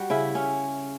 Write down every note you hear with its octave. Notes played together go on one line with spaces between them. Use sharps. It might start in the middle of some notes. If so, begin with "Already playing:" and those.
Already playing: G3 F#4
C#3 E4
C#3 C#4